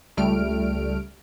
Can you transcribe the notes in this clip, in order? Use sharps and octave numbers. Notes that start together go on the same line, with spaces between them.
C#2 G3 A3 F6 D7